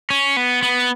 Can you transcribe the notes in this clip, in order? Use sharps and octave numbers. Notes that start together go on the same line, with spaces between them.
C#4
B3
B3